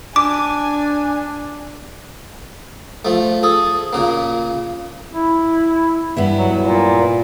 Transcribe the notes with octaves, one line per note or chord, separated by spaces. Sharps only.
D4 G#5 D6
F3 A3
G#4 A4
A#2 C#3 A#3
E4
G2 B3 E4
F#3
A#2